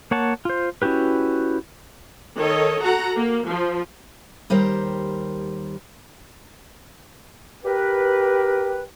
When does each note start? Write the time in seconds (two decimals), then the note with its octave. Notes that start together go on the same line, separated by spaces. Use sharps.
0.11 A#3 C#5 F#5 A5
0.45 F4 C5
0.82 C#4 E4 F#4 G4 B4
2.38 D#3 A4 C#5 D#5
2.81 F#4 A4 F#5 A#5
3.16 A#3
3.46 F3
4.50 D#2 G3 A#4 C5 G5
7.65 G4 A#4 B4